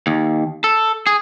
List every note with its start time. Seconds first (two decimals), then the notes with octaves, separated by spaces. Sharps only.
0.07 D#2
0.64 A4
1.07 G#4